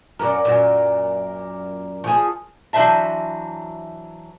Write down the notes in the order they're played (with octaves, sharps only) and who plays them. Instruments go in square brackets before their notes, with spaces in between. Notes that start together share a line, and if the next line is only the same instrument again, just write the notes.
[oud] F#2 F#3 [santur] A#4 D5
[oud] F#2 A#2
[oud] F3 G#4 [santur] C#6 D#6
[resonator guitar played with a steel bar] E3 F#3 D4 C5 E5 A5